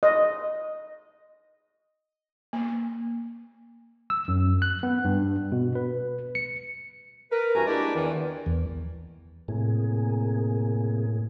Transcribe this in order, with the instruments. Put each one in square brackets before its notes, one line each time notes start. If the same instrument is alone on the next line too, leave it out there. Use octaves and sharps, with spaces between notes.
[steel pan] D#5
[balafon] A#3
[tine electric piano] E6
F#2
F#6
B3
G2
B2
B4
C#7
[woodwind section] A#4 B4
G2 E3 F#4 G#5 A#5
G#3 A#3 D4 E4 G4 D5
E2 D#3 E3
[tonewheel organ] E2
[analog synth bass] A2 [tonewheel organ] C3 A#3 G#4